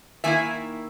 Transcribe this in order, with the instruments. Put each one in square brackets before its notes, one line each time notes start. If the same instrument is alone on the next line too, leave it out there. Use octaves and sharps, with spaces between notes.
[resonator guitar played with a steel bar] D#3 A#3 E4 E5 G#5